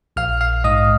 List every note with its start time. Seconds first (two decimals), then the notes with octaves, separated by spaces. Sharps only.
0.16 A#1 F5 F6
0.41 F5 F6
0.64 G#2 D#5 D#6